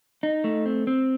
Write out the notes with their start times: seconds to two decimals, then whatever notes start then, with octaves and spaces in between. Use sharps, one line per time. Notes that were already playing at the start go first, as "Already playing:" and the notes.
0.23 D#4
0.44 A3
0.66 C4
0.87 C4